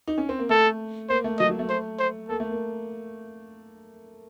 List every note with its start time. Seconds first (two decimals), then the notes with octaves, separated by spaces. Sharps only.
0.08 D#4
0.18 C#4
0.29 C4
0.39 A#3
0.49 A3 A4
1.09 A#3 C5
1.24 A3
1.39 F#3 D#5
1.49 F#3
1.59 A3
1.69 C5
1.99 C5
2.29 A#3 A4
2.40 A3
2.51 A#3